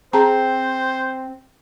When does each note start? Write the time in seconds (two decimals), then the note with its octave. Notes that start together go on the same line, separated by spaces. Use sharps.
0.13 C4 G#4 C5 A5 A#5